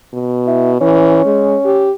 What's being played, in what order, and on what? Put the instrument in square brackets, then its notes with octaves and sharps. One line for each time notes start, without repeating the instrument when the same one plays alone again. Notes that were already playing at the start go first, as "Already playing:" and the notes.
[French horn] B2
[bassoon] E4
[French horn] E3 [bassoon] C#4
[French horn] G#3
G4